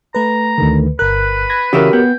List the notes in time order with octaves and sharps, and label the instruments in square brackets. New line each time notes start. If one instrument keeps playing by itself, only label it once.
[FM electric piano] A3 B4 [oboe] A#5
[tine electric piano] D2 D3 D#3
[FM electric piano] G1 A#4 [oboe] B4 [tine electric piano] F#6
[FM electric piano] B5 G#6 A#6
[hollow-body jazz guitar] C#3 E3 E4 [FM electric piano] F#4 C#5 [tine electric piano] G4 A#4
[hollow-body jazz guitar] B3 [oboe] G5